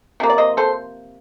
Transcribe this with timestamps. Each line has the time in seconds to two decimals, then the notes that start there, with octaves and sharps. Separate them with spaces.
0.20 C3 F3 A#3
0.30 D5
0.38 C5 D#5
0.57 A4 C5